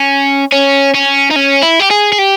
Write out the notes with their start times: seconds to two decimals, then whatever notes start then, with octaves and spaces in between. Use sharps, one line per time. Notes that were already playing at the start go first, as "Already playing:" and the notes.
Already playing: C#4
0.52 C#4
0.94 C#4
1.31 D#4
1.36 C#4
1.62 E4
1.80 G4
1.90 G#4
2.12 G#4
2.18 G4